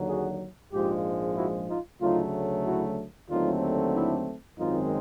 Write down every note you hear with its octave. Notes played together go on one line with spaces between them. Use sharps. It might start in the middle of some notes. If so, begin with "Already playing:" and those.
Already playing: D#2 D3 F#3
F#4 G#4
A#1 G#2 F3 G#3 F4 G4
E4 F#4
D#4 F4
D2 C#3 F#3 A3 D#4 F4
E4 F#4
D#2 D3 F#3 A3 C4 D#4 F4
D4 E4
G#1 F#2 D#3 G#3 C4 D#4 F4